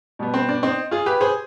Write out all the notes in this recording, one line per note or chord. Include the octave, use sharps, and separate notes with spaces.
B2 G3 B3
C4
D4
C4 D#4
F4 G#4
G4 B4
G#4 C5